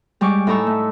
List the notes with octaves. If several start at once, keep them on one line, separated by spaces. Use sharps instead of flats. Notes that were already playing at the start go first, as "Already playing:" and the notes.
G3 G#3 C#6 D6
A2 D#4 A4 A#5 C#6 E6
A3